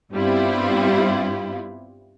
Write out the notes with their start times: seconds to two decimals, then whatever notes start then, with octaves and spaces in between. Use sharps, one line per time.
0.12 G2 G3 B3 C4 E4 F4